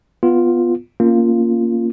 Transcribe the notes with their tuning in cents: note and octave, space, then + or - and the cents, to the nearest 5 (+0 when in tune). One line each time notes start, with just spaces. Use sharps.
B3 +0 F4 +0
A#3 +0 C#4 +0 F4 -10